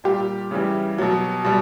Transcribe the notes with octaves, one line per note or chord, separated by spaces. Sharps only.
A#2 G3 G4
C#3 E3 G3
B2 F#3
B2 G3